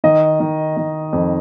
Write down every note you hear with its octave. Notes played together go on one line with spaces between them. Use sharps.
D#3 D#5
D#3
D#3
F2